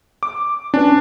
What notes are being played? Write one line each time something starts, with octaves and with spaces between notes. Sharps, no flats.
D6
C#4 D4 B4